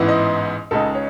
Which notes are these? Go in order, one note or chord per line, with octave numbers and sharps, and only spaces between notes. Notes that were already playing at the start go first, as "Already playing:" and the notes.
Already playing: A1 G#2 E3 B3 E4
D#5
C#2 C#3 G#3 D#4 A4
C#5